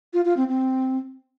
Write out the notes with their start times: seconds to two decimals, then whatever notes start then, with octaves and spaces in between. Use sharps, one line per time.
0.14 F4
0.25 F4
0.37 C4
0.49 C4